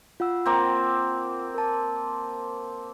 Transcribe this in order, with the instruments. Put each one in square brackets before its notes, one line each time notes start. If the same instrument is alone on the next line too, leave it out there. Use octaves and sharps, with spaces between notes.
[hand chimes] F4 F#5 E6
[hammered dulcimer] A#3 C4
[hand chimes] A#4 A5